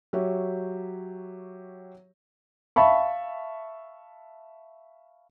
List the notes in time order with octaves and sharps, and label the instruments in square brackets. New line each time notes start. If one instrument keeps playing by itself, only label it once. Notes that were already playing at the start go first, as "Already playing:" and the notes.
[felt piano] F#3 G4 C#5 E5
[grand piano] E5 F5 A5 B5 C#6